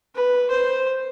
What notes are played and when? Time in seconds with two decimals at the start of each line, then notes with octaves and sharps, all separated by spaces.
0.15 B4
0.51 C5